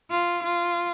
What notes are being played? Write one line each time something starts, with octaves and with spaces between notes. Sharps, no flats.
F4
F4